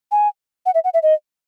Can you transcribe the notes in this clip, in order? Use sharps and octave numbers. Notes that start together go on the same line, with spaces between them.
G#5
F#5
E5
F#5
E5
D#5